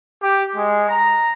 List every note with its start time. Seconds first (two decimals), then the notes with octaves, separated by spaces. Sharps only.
0.22 G4
0.55 G#3
0.88 A#5